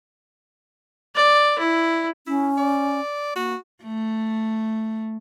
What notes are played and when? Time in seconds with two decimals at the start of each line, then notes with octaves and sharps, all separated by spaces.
1.15 D5
1.59 E4
2.27 C#4 E4
2.58 D5
3.36 A#3 F#4
3.83 A3